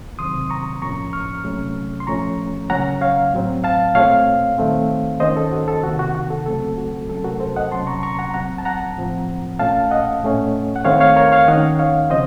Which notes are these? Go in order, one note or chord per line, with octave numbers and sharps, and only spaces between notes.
C3 D#3 F#3 C4 C6 D#6
A#5 C#6
A2 F3 A#3 C#4 A#5 C#6
C#6 F6
C3 F#3 A3 C#4
C6
A#2 F3 A3 C#4 A#5 C#6
C#3 F#3 A#3 C#4 F#5 A#5
C#5 F5
A2 F#3 C4
F5 A5
A#2 A3 C4 C#5 F5
D#3 A3 C4
D#3 A#3 C#4 C5 D#5
A4
F#4
A4
C3 D#3 A#3 F#4
F#4
F#4
A4
C#3 F#3 A3 C4 A4
F#4
C3 F#3 A3 C#4 A4
F#4 A#4
A4 C5
D#5 F#5
C3 F#3 A#3 C#4 A5 C6
A#5 C#6
A#5 C#6
F#5 A#5
A#2 F#3 C4 F#5 A#5
A5
F#5 A#5
A2 F3 C4
A#2 A3 C#4 F5 A5
D#5 F#5
A2 A3 C#4
F#5
D#3 A3 C4 C#5 F5
C#5 F5
A#4 C#5
C#5 F5
D#3 A#3 C#4 D#5 F#5
C#5 F5
C#3 F3 C4 C5 D#5